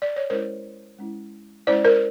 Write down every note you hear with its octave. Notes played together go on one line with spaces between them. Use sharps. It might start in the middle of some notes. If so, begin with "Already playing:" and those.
D5
C#5
G#3 C#4 E4 A#4 C5
G#3 C#4 E4
G#3 C#4 E4 C5 D5
A#4 C5